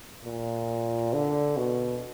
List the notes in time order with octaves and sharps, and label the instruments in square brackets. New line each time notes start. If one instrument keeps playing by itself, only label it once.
[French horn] A#2
D3
B2